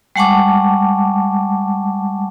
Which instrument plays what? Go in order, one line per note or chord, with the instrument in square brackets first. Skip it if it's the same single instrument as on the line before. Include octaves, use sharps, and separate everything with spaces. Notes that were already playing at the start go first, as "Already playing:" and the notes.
[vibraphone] G3 G#3 F#5 A5 C#6 D6